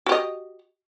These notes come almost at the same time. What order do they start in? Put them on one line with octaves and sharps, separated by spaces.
F#4 G4 D#5